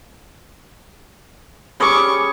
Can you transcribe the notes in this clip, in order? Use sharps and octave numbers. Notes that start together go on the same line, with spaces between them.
G3 C#4 G#4 C#6 D6